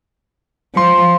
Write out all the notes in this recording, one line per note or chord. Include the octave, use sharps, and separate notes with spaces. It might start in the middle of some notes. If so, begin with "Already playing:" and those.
F3 C6